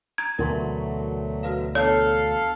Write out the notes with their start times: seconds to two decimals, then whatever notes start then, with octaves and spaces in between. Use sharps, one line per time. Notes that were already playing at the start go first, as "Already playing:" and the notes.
0.18 A#5 G#6
0.39 D2 B2 E3 F#3 A3 A#4 C6 C#6
1.43 F#4 B4 F5
1.75 B3 D4 A4 C#5 F5